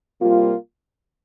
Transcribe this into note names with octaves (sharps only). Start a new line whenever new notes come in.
C3 G3 A#3 F4